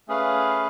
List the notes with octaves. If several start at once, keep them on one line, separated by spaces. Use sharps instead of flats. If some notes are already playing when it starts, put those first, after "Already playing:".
A3 C#4 G#4 B4 F5